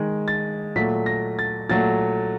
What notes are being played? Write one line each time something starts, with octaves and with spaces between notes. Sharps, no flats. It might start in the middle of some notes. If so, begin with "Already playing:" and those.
Already playing: D#3 G#3
A6
A#2 F#3 A3 B6
A#6
A6
A#2 F#3 A3 A6